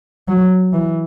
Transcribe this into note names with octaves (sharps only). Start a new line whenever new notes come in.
F#3
E3